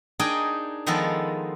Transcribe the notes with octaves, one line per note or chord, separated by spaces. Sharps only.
D4 D#4 G#4 A#4 G5 G#5
D#3 F3 G#3 B3 A4 A#4